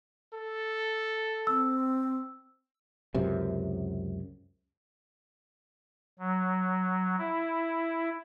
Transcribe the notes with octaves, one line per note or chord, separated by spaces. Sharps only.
A4
C4 E6
C#2 F#2 C3
F#3
E4